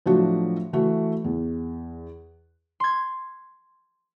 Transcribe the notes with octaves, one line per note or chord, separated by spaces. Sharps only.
A2 F3 F#3 D4 F#4
E3 A3 F#4
E2
C6 G#6